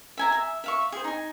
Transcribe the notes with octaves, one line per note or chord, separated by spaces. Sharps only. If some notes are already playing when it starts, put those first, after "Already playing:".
E5 G#5 A#5
E5
E5 F5 C#6
G#4 C5
D#4 G#5